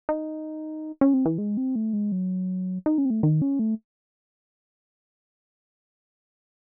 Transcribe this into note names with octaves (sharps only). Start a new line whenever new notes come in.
D#4
C#4
C4
E3
G#3
C4
A3
G#3
F#3
D#4
C#4
C4
A3
D#3
C#4
A3